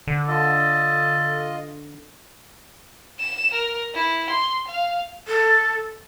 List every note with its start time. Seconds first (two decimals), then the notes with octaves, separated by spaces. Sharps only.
0.07 D3
0.28 F4 A4 D#5
3.19 E7
3.53 A#4
3.94 E4
4.30 C6
4.68 F5
5.28 A4